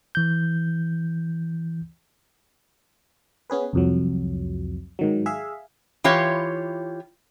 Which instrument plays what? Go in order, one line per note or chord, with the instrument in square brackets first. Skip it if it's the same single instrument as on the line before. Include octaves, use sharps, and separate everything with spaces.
[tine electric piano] E3 G6
[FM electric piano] B3 C#4 G#4 B4
C2 F2 F#3
G#2 D#3 F#3
G#4 E5 F5
[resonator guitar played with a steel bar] E3 F4 G4 C#5